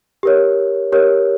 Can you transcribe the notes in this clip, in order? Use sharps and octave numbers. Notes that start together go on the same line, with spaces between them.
G4 A#4 C#5
G4 A#4 C#5